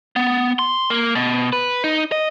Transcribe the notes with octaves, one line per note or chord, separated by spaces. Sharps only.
B3
C6
A#3
B2
B4
D#4
D#5